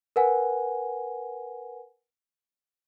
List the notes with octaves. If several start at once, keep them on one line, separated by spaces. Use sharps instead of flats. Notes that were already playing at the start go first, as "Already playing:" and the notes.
A#4 B4 F#5 G#5